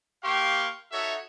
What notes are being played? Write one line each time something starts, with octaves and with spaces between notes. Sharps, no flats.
A#3 G4 F5 G5 C6 C#6
D#4 F#4 A4 C#5 E5